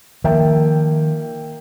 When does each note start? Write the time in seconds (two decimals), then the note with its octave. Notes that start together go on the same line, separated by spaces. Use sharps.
0.24 D#3 F3 A#3 E5 G5